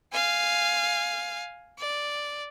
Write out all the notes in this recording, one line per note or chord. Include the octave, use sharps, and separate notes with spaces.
F5 G#5
D5